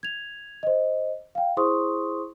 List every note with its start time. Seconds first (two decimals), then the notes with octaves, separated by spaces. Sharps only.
0.03 G#6 F7
0.63 C5 D#5
1.35 F5 G5
1.57 E4 G#4 C5 C6 C#6 D#6